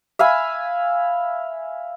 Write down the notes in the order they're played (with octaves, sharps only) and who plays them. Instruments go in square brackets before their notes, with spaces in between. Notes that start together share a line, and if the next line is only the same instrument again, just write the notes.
[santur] E5 F5 G#5 B5